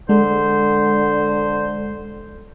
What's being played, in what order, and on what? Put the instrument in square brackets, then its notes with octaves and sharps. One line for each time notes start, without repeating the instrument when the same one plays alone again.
[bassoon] D3 [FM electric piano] G#3 [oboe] C5